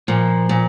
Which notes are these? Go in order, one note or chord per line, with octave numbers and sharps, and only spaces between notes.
A#2 F3
A#2